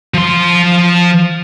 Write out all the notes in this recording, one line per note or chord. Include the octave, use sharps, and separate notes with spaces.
F3 C6